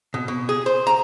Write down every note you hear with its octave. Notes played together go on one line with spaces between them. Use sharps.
B2
B2
G#4
C5
A#5